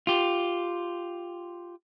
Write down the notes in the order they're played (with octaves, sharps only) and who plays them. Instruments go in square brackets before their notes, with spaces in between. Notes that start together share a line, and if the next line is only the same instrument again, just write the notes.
[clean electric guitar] F4 G4